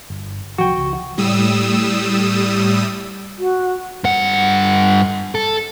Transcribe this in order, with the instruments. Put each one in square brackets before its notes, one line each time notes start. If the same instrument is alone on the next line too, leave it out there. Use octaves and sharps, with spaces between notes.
[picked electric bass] G1
[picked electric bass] C2 F3 F#3 [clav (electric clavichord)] F#4 G5
[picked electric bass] C#2
[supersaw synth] A2 G3 D#6 E6
[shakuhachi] F#4
[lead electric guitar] G2 F#5
A4